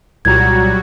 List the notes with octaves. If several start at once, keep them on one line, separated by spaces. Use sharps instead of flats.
C2 A#2 F#3 G3 F#4 A#5 G#6